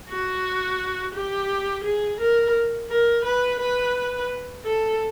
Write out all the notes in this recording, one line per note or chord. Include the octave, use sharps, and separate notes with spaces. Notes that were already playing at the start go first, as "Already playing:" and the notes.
F#4
G4
G#4
A#4
A#4
B4
B4
A4